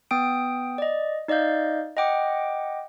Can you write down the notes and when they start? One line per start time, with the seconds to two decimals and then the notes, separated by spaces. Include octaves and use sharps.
0.11 B3 G5 D#6 D7
0.78 D5 D#5
1.28 D#4 D5 D#5 F5 G6
1.97 D#5 F#5 G5 D6